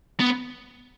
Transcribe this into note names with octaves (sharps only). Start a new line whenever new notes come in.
B3